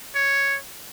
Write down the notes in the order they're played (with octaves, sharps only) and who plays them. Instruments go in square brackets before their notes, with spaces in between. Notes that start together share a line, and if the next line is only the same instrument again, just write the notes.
[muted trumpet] C#5